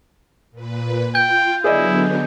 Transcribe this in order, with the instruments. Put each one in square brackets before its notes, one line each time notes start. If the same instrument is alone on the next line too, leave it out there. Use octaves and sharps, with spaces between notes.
[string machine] A#2 B4
[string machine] F4 [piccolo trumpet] G5 [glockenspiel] G6
[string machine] D3 F#3 B3 [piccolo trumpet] E4 [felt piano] G#4 D5 D#5